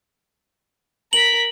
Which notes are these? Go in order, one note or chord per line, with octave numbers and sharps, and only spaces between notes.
A#4 B6 F#7